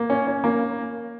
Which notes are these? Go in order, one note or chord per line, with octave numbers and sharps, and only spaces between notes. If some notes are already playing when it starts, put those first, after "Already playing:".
Already playing: A#3
C#4
C#4
A#3